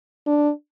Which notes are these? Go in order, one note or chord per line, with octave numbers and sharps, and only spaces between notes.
D4